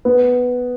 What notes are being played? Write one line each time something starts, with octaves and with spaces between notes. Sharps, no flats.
B3